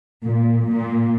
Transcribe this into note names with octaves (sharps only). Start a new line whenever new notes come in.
A#2
A#2